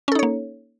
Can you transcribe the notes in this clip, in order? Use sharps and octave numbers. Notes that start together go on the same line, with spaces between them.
A#3 C#4 D#4 A4 C#5